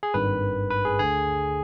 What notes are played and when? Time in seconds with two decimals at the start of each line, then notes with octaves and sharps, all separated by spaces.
0.03 G#4
0.14 G#1 G2 D#3 B4
0.70 B4
0.85 G#4
0.99 D2 D3 G#4